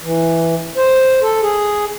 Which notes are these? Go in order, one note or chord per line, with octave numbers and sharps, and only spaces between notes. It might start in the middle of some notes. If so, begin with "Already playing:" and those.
E3
C5
A4
G#4